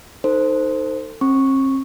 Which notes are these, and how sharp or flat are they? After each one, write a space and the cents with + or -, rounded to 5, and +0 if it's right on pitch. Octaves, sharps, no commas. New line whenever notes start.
D#4 +0 A4 +30 C5 -5
C4 +45 C#6 +0